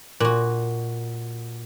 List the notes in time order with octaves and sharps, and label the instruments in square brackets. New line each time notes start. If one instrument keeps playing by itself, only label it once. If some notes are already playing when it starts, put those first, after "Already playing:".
[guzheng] A#2 F#4